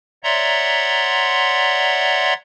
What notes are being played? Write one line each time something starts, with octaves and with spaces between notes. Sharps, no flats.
C#5 D5 E5 F#5 A#5 C6